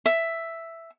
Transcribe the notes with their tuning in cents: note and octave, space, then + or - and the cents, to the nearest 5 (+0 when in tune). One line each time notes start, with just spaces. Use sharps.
E5 +5